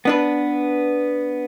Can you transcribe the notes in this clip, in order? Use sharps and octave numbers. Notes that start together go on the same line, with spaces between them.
B3 D4 B4